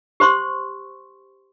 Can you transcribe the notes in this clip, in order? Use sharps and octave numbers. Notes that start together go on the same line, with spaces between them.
G4 C5 C6 C#6